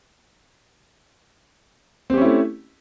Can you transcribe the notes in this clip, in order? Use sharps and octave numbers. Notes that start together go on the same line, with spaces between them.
A3 C4 C#4 E4 G4